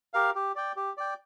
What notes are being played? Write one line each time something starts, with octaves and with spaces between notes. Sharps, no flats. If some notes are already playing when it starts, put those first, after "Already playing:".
G4 A#4 F5
G4
D5 G5
G4
D5 G5